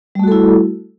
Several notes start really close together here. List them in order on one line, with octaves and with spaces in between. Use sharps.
G3 A3 F#4 A4 E4